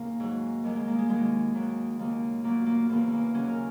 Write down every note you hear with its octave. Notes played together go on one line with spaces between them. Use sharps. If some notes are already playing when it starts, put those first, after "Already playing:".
Already playing: D#2 C#3 A#3
G#2 F#3
D#2 D#3 F#3 G#3
G#3
A#3
G#3
D#2 D#3 F#3 G#3
D#2 D#3 F#3
D#2 C#3 F#3 A#3
A#2 F#3 A#3
A#3
E2 C#3 E3 A#3
A#3
D#2 C#3 F#3 C#4
A#4